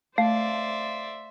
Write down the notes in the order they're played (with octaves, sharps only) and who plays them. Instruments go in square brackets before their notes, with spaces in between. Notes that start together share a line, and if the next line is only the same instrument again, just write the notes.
[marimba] A3 [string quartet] C5 D5 E5 [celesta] F5